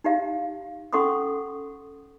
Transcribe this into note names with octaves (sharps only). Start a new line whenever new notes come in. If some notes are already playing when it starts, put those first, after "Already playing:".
D#4 G4 F5
C#4 A4 F#5 C6 C#6 D#6